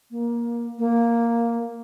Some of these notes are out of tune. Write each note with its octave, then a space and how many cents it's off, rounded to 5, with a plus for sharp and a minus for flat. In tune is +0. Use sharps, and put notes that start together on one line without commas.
A#3 +20
A#3 +0